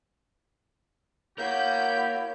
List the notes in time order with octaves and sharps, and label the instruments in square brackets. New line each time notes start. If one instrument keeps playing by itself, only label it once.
[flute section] E4 F#4 C#5 [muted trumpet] G4 [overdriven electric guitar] A#4 F5 [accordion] G6